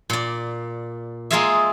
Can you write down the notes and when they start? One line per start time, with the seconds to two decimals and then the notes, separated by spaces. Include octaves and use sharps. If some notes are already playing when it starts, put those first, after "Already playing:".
0.10 A#2 D5
1.31 G#3 A#3 F4 G#4 D#5 E5